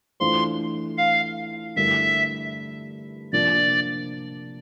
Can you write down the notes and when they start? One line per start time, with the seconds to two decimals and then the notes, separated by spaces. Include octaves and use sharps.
0.20 E3 A3 D4 F4 C5 C6
0.98 F5
1.76 G2 D3 A3 E4 A#4 E5
3.33 C3 F3 A#3 D4 D5